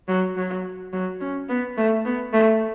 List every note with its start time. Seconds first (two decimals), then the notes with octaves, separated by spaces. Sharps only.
0.08 F#3
0.37 F#3
0.93 F#3
1.21 C#4
1.49 B3
1.77 A3
2.05 B3
2.33 A3